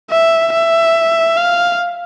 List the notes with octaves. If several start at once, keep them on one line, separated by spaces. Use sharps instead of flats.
E5
E5
F5